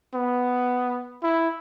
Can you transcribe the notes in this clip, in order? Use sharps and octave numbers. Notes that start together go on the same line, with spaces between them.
B3
E4